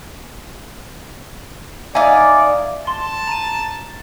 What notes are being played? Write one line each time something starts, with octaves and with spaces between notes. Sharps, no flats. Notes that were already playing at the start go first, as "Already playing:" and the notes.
D#4 D5 E5 F5 G#5
A5 C6
A#5 D#7